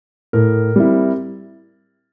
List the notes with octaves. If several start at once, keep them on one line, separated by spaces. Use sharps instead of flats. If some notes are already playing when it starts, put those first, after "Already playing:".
A2 A#4
G3 C4 E4